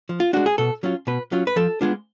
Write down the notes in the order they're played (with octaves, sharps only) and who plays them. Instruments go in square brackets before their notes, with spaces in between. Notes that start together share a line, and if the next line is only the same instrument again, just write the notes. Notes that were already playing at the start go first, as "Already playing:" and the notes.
[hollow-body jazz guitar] F3
F4
G#3 D4 F#4
G#4
B2 A4
F#3 C#4 F4
B2 B4
F#3 C#4 F4
B4
F3 A4
G#3 B3 D4 F4